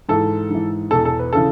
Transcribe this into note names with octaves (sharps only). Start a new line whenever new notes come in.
G#2 E3 A4
G#2 E3
E2 B2 A4
A4
B4
C#3 E3 A4